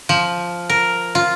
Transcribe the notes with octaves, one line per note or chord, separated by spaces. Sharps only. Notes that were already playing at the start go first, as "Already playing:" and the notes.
F3
A#4
F4